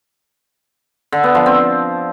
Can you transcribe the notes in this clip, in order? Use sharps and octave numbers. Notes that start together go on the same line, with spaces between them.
D3
B3
F3
C4